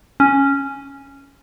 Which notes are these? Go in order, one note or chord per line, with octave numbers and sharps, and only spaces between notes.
C#4